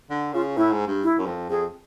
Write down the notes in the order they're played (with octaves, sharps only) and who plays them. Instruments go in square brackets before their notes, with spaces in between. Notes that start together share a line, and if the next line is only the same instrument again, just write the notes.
[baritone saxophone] D3
[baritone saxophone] C#3 [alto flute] F4
[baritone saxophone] A2 [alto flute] E4
[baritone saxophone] G#2
G2
[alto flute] E4
[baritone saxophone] F#2
F2
[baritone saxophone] F2 [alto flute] G#4